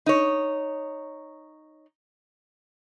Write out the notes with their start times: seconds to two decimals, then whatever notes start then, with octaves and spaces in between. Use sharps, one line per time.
0.06 D#4 C#5